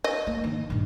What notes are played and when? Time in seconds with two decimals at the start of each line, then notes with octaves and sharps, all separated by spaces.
0.04 D#5
0.27 A#3
0.44 D#3
0.70 G2 A#2